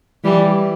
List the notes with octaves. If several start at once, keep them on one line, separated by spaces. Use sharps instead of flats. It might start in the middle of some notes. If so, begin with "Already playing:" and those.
E3 G3